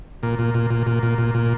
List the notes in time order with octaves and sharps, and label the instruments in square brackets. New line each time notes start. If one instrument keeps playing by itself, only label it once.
[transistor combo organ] A#2
A#2
A#2
A#2
A#2
A#2
A#2
A#2